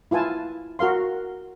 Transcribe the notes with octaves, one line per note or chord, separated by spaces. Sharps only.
E4 F4 B4 G#5 A5
F#4 A#4 F5 C6